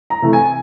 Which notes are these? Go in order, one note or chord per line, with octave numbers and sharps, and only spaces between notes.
A#5
C3 E3 A3
G#5